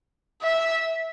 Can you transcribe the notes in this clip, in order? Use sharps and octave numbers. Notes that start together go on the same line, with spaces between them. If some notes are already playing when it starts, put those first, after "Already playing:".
E5